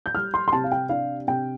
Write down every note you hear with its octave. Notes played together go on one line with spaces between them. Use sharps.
G6
G3 F6
C6
C6
C3 A5
F5
G5
D4 F5
C3 G5